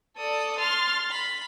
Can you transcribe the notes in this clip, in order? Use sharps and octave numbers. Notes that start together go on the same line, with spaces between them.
A4 D5 D#6
C6 F6 A6
B5